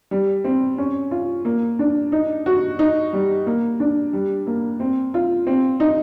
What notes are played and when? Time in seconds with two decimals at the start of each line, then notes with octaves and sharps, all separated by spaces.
0.11 G3
0.44 C4
0.78 C#4
1.11 F4
1.45 A#3
1.79 D4
2.12 D#4
2.46 F#4
2.79 D#4
3.13 G3
3.46 A#3
3.80 D4
4.13 G3
4.47 A#3
4.80 C4
5.14 F4
5.47 C4
5.80 D#4